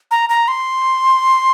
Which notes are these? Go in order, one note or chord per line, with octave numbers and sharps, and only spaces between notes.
A#5
A#5
C6